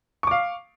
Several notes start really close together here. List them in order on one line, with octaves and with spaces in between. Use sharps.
C#6 D6 F5